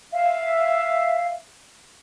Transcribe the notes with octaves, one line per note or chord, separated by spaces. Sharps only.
E5 F5